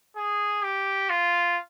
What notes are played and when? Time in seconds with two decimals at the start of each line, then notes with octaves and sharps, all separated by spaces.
0.17 G#4
0.63 G4
1.10 F4